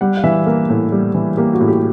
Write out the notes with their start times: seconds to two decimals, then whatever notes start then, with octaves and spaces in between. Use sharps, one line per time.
0.01 G3 F#5
0.17 F5
0.24 E3 E5
0.46 A#3 A#4
0.69 A2
0.92 G3
1.15 E3
1.37 A#3 G4
1.53 F#4
1.61 A2
1.68 G4